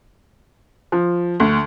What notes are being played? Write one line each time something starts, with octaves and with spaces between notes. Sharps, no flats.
F3
D2